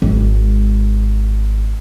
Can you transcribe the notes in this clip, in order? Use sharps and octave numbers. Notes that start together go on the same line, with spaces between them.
G#1 G#3